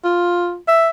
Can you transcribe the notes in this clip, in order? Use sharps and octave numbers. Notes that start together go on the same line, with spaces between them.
F4
E5